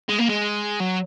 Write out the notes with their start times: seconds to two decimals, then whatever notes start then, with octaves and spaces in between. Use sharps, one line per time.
0.09 G#3
0.18 A#3
0.29 G#3
0.80 F#3